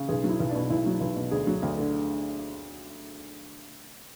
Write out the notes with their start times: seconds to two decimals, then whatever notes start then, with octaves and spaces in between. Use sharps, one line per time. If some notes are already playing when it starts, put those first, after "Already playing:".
Already playing: C#3
0.09 B1 G#4
0.24 F#3
0.29 E4
0.40 B1
0.49 D4
0.55 B2
0.70 B1 E4
0.86 F#3
1.00 B1
1.16 B2
1.31 D2 G#4
1.47 F#3
1.62 D2
1.78 D3